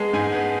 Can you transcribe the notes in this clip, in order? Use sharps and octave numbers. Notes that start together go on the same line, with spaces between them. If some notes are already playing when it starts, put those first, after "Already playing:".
Already playing: G#3 B3 A5
G#2 G#5
B3